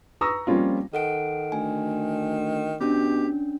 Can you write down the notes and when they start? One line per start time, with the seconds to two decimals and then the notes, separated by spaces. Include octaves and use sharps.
0.21 B4 A#5 C#6 D#6 E6 A#6
0.47 F3 G3 A#3 C4 C#4 F4
0.93 D#3 A4 F#5 D7
1.52 D2 G#5
2.81 B2 C#4 D4 G4